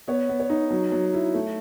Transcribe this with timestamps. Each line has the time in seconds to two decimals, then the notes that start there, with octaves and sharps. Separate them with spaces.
0.08 B3 C#5
0.29 B3
0.40 C#5
0.50 D#4
0.71 F#3
0.92 F#3
1.14 E4
1.34 A3